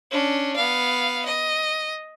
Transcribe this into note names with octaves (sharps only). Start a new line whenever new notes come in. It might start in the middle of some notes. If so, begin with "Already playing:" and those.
C#4 D4
B3 F5
D#5